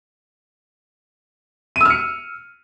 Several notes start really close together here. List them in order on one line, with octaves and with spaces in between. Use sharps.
D#7 E6 F6 C#7